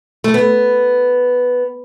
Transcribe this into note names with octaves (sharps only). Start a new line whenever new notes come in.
A3
B3